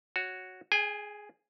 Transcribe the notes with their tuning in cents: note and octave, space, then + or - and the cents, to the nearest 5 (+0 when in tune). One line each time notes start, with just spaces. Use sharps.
F#4 +0 C#5 +0
G#4 +5 G#5 -45